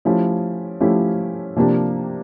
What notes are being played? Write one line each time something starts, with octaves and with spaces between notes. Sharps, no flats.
F3 A3 C#4 E4 G4
F3 A3 C#4 E4 G4
C3 F3 A#3 D4 G4